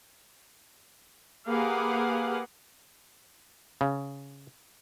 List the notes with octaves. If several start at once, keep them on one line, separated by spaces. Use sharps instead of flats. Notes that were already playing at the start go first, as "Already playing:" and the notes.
A#3 G4 G#4 B4 F5 F#5
C#3